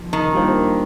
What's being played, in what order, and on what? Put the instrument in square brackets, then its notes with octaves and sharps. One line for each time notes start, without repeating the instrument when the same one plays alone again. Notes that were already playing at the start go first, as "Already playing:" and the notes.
Already playing: [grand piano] F3 A#3 D#4
[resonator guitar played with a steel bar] D#3
[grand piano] G3 A#3 D4 F4 C5